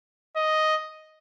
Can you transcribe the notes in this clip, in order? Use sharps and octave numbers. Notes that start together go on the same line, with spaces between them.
D#5